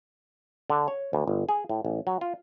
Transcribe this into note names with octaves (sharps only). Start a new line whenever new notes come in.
D3
C#5
D2
G1
G#4
A2
A1
F#3
F4